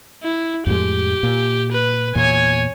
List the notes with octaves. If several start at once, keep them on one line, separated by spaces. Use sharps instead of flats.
E4
F2 A2 G#3 G4
A#2
B4
E2 A#2 C#5 G#5